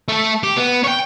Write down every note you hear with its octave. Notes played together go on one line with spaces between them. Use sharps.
A3 A4
G4
B3
C#5 G5